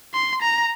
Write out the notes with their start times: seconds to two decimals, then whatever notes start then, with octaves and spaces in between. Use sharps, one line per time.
0.14 C6
0.42 A#5